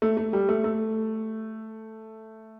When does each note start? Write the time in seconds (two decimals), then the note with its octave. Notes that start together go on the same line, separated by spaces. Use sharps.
0.02 A3
0.17 A3
0.33 G3
0.49 A3
0.64 A3